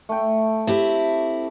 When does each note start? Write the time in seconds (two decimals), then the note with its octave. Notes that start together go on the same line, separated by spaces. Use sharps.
0.09 A3 G5
0.67 C4 E4 G4